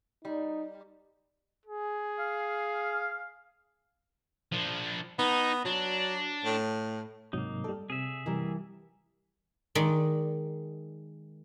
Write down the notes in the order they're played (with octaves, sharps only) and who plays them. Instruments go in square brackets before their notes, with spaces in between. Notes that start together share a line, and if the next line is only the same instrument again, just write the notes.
[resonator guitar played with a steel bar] G3 [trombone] D#4
[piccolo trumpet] G#4
[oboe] F5
[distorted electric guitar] F3 D4
[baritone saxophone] B3 [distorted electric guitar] D#4
[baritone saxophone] F#3 [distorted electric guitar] D4
[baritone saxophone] A2
[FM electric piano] G#2 C3 F#3 [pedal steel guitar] A#3 D#4
[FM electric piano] G3 A4 [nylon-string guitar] D5
[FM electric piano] C3 [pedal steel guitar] G#4 E5
[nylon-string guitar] E3 G3 A#4
[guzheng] D#3 G#3 D5